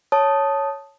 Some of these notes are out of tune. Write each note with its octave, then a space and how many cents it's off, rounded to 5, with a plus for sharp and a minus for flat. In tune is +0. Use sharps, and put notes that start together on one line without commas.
C#5 +0 A5 +0 D#6 +0